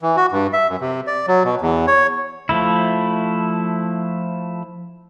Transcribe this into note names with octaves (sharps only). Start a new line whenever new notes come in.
E3
F#4
G2
E5
F#2
C3
D5
F#3
B2
E2
C#5
F3 A3 E4